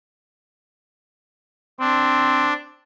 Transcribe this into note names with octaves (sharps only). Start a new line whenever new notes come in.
C4 D4